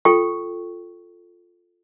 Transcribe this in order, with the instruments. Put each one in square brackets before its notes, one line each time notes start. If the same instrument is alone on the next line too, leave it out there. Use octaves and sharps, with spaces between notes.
[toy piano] F4 A4 G5 C#6